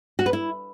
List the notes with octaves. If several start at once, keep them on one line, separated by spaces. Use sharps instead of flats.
F#4
B4
E4